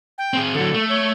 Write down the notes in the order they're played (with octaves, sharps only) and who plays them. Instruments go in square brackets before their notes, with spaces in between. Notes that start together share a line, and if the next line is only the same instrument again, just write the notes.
[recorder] G5
[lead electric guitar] C4 G#4
[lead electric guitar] D3 F#3 [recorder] A4
[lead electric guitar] A3
[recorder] C#5